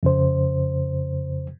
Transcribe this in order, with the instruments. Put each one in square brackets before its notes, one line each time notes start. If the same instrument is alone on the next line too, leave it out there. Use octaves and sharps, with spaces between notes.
[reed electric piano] F2 C#3 C5